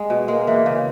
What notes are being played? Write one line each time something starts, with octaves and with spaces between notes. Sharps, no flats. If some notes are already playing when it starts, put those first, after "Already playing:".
Already playing: G#3
B2
G#3 A#3
E3
C#3